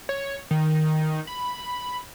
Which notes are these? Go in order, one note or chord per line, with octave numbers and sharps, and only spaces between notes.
C#5
D#3
B5